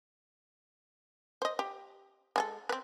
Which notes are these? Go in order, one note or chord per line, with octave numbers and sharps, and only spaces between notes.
C5 D#5
G4
G#3 G#4 A4
C4 B4